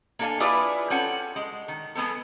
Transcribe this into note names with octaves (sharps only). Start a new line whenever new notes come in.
A#3 D4 A4 D5 F5 G#5
E4 F4 G#4 B4 D5
C4 C#4 A4 F#5
G#3
D#3
G#3 B3 C4 A4